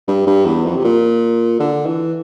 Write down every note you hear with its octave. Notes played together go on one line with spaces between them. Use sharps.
G2
G2
E2
F2
C3
A#2
D3
E3